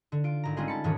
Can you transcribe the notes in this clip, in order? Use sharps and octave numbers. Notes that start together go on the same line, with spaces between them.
D3
F4 D7
G#1 A#5
G3 G#3 C4 C#4 F4 G#4
A5 B5 C#7
E1 G#2 D#3 G3 G#4 C#5